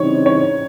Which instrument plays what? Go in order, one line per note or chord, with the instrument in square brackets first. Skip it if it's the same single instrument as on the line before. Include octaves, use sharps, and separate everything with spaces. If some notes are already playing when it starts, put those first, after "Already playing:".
Already playing: [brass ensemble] C#3 E3 G3 C4 D#4 [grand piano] C#5
[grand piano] C#5